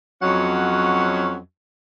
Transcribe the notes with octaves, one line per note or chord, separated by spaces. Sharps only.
F2 F#3 C#4 F#4 D#5 F#5